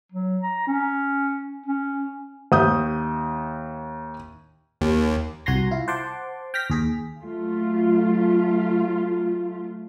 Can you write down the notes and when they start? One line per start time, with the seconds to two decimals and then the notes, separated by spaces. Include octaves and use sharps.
0.12 F#3
0.43 A#5
0.67 C#4
1.66 C#4
2.52 D#2 E5 D#6 G6
4.81 D#2
5.46 C2 F#4 G#5 A#5 C6 A#6
5.71 E4 F4
5.88 C5 F#5 A5 C6 D6
6.54 G5 F6 A#6 B6
6.70 D#2 G#4 B6
7.20 F#3 A3 F4